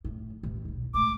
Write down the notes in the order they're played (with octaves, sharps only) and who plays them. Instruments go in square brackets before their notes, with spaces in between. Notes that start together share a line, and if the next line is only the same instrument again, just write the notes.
[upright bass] F#2 A2
A1 D#2
D#1 B1
[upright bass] G#2 A3 [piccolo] D6